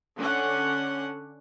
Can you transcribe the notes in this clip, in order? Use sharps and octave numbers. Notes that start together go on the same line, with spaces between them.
D3 C#4 D4 F#5